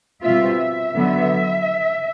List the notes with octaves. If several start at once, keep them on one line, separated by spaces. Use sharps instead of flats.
B2 G3 C4 F4 E5
E5
D3 F#3 B3